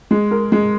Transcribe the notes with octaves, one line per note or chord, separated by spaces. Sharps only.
G#3
A#4
G#3